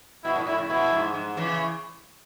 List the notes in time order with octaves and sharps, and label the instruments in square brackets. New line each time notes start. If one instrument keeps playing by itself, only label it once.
[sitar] B2 [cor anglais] E4
[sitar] A2
[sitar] A2 [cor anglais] E4
[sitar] C#3
[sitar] B2 [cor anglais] E4
[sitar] G#2
G#2
C#3 E3